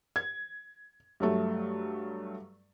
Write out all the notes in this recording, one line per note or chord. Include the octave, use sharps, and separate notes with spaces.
G#6
G2 F#3 A3